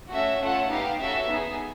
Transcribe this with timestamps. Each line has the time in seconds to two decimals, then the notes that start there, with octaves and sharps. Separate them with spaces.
0.13 A3 C#4 F#4 E5
0.42 A3 C#4 F4 A4 F#5
0.71 B3 D#4 G4 F5
1.01 C#4 F#4 A4 E5
1.29 B3 D#4 G#4